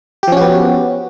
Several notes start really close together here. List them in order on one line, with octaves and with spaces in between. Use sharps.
G4 F3 C#4 F#4 B3